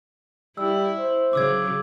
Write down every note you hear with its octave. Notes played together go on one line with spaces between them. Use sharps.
G3 E4 E6
C5
C#3 F#3 D6 E6 G#6